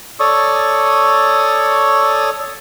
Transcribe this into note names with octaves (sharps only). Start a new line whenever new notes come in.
A4 C#5 D5 C#6 D#6